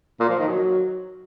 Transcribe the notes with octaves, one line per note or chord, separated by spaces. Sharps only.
A#2
F3
D#3
F#3